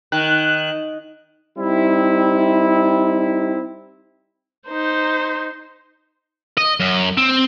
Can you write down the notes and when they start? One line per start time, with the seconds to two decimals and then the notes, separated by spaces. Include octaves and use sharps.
0.12 D#3 F#6
1.58 G3 C4 D#4 E4
4.67 D#4 C5
6.58 D#5
6.80 F#2
7.18 C4